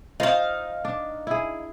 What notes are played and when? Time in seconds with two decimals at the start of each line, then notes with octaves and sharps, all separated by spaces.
0.20 D#4 F4 C5 F5
0.85 D4
1.27 E4 G#4